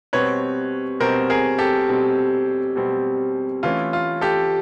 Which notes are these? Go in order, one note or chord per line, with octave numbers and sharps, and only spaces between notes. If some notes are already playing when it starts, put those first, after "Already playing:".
B2 G3 C4 B4 C#5
B2 G3 C4 A#4 C5
G#4 A#4
G4 A4
B2 G3 C4
B2 G3 C4
E3 A3 C#4 F4
F4
G4 A4